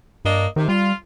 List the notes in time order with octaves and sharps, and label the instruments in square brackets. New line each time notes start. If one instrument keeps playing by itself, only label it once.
[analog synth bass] G2 [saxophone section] A#3 D4 D#5
[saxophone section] C3 [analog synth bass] D#3
[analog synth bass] G3 [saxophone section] F4